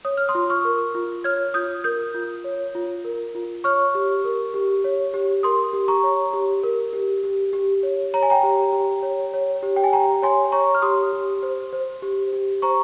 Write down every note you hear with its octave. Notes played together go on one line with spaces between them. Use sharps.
C#5 D#6
F6
C6 D#6
F4
C#6 F6
A#4
F4
C#5 F6 G#6
F4 D#6 G6
A#4 D#6 G6
F4
C#5
F4
A#4
F4
C#5 C#6 F6
G4
A#4
G4
C#5
G4
A#4 C6 D#6
G4
A#5 C#6
C#5
G4
A#4
G4
G4
G4
C#5
C#5 A#5
G#5
G5 A#5
G4
G4
C#5
C#5
G4
G5
G#5
G4 G5 A#5
C#5 G#5 C6
C#5 A#5 C#6
F6
G4 C6 D#6
G4
C5
C5
G4
G4
C5 A#5 C#6